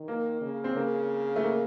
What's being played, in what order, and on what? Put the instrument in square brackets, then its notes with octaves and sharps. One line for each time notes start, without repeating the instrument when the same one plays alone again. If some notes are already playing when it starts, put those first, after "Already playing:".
Already playing: [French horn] D#3
[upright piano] A#3
[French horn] C#3
[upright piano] C4
[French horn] C#3 [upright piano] A#3
[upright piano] A3
A#3